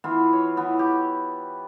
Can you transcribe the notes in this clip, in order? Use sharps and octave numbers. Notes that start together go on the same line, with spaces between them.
E3 B3 F4
C#5
E3 B3
G4